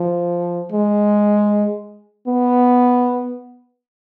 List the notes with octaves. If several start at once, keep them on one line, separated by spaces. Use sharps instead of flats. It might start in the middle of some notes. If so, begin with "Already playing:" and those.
Already playing: F3
G#3
B3